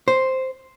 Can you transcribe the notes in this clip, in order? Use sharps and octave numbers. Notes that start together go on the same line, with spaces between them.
C5